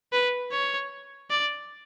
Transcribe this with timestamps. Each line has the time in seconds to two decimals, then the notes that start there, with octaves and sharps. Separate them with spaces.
0.13 B4
0.52 C#5
1.30 D5